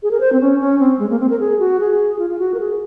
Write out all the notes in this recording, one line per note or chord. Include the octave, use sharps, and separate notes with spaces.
G#4
A#4
C5
C4
C#4
C#4
C4
G#3
A#3
C4
A#4
G#4
F#4
G#4
F4
F4
F#4
A#4
G#4